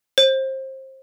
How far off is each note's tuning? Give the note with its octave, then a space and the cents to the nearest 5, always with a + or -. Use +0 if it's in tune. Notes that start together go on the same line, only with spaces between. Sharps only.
C5 +25